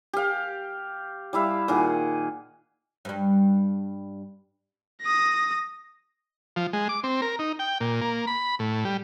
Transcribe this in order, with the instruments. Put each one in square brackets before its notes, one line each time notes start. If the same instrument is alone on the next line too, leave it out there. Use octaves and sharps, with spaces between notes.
[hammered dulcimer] G4 F5
G3 E4 E5 F5
A#2 D#3 G#4 F#5
[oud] G2 G3
[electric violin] D#6 A#6
[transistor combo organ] F3
G#3
D6
C4
A#4
D#4
G5
A#2
A#3
B5
A2
G3